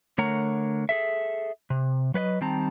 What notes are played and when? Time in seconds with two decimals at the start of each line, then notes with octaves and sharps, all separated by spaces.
0.18 D3 A3 A#4 C#5 F#5 A#5
0.89 G#4 A4 E5
1.70 C3
2.14 F#3 B4 C#5 D#5
2.41 D#3 G3 C4 A5 A#5